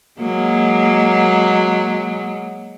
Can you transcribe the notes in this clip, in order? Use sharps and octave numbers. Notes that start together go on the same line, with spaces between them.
F#3 G#3 A#3